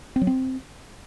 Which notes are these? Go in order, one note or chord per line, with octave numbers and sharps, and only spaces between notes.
C4
F#3
C4